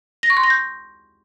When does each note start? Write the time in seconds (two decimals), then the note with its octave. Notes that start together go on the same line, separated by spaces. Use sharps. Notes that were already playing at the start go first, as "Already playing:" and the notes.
0.23 A#6
0.30 C#6
0.37 C6
0.43 A#6
0.50 G6